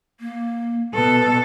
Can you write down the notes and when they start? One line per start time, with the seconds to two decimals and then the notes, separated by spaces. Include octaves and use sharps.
0.20 A#3
0.94 B2 A4 B4